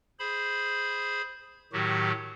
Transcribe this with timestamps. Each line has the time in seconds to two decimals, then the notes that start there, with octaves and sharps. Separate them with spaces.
0.19 G#4 C5 B5
1.73 A2 D#3 F#3 F#4 G4